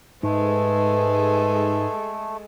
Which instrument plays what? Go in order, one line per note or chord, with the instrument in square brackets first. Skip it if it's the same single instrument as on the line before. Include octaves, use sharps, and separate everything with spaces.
[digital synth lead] G#2 [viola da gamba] G#3 G#4 A4 [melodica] A3 [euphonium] B4